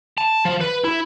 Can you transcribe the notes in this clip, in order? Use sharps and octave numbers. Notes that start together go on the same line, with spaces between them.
A5
F3
B4
E4